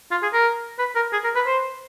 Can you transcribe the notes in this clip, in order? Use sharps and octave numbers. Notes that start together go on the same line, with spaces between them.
F4
G#4
A#4
B4
A#4
G#4
A#4
B4
C5